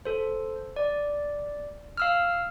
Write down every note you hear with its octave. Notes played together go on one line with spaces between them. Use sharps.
A4 C5
D5
F5 E6 F6